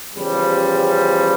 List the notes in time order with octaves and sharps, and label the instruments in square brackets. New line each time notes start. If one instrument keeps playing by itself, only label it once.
[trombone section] E2 C#3 F3 G3